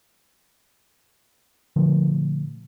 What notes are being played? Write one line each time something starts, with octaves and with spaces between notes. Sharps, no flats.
A#2 D3 F3 A3